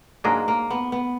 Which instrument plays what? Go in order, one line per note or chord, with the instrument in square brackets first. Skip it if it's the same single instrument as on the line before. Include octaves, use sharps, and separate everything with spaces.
[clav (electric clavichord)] G#2 F#3 D4 G#4 D#5 [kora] A#3
[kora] A#3
B3
B3